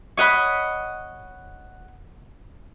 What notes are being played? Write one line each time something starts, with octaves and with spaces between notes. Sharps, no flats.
C#5 D#5 F#5 B5